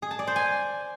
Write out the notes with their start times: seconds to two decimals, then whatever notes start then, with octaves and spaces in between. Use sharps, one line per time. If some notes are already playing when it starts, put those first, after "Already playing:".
0.02 G#4
0.11 A5
0.19 D5
0.27 C5
0.36 G#5